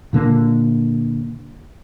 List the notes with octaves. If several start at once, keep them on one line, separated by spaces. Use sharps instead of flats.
A#2 D3 A#3